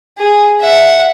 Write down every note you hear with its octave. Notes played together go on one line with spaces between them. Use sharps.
G#4
E5 F#5